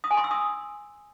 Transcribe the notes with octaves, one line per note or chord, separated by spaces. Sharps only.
D#6
G#5
C6
E6
D#6